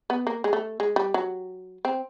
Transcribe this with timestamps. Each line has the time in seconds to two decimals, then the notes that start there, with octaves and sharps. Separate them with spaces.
0.10 B3
0.27 A#3
0.44 G#3
0.53 A3
0.80 G#3
0.96 G3
1.14 F#3
1.85 C4